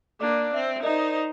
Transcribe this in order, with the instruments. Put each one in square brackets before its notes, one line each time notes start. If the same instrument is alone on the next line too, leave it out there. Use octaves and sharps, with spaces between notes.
[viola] A#3 D4 [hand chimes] D5 D6
[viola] C4 [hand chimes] E5
[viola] D#4 C5 [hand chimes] A#4 D5 D#5